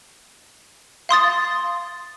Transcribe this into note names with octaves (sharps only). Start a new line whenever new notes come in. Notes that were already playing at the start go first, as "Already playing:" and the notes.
F5 C6 D#6 A6